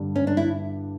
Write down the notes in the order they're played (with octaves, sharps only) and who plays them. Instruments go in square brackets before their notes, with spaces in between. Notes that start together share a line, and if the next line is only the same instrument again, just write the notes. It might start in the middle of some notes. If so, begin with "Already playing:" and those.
Already playing: [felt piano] G2 D3 G3 D4
[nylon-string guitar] C#4
D4
E4